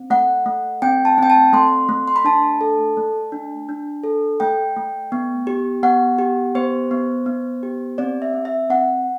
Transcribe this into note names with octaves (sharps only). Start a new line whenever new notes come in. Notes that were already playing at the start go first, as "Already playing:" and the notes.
Already playing: C4
A3 F#5
A3
C4 G5
A5
C4 G5
A5
A3 C6
A3
C6
B5
D4 A5
A4
A3
D4
D4
A4
A3 G5
A3
B3
G4
B3 F#5
G4
B3 C5
B3
B3
G4
C4 D5
E5
C4
E5
C4 F#5